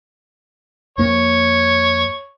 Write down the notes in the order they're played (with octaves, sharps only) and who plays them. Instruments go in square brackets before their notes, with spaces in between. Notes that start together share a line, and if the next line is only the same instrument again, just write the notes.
[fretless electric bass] F2 A#3 [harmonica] C#5